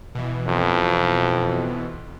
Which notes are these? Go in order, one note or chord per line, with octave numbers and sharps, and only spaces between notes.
B2 E3
F2